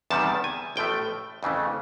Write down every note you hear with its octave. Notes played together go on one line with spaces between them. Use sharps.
E2 C3 D#3 G3 A5
G#5
A1 A2 F3 A3 G5
F2 C#3 E3 A3